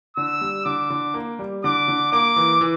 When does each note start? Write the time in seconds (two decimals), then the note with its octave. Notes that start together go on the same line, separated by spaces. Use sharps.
0.17 D3 E6
0.41 G3
0.65 D3 D6
0.90 D3
1.14 A#3
1.39 G3
1.64 D3 D6
1.88 D3
2.12 A#3 D6
2.36 E3
2.61 E3